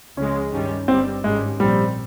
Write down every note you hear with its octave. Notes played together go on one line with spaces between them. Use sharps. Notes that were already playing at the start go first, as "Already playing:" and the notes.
C#2 C#3 F3 G#3 C#4
G2 D#3 G3 C#4
G1 G2 G3 C4
G#1 G#2 D#3 G3 G#3 C#4
A#1 A#2 F3 G3 C4